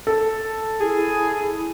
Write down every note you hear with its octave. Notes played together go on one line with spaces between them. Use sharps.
A4
E4 G#4